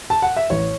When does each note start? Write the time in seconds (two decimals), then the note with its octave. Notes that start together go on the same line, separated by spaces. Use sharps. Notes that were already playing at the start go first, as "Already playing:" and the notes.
0.10 A5
0.22 F#5
0.37 E5
0.50 A1 C#5